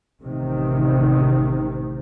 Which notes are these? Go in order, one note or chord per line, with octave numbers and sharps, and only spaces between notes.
A1 C3 D#3